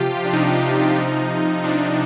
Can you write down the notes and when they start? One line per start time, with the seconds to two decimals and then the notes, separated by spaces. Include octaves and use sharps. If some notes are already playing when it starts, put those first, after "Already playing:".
Already playing: C3 F3 F4 G4
0.17 F4
0.25 D4
0.33 C3 F3 D#4
0.98 C3 F3
1.64 C3 F3 D4